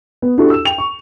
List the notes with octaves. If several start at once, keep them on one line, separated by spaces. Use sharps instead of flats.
B3
D4 E4 F#4 G4 A4
E6 E7
G5 F7
C#6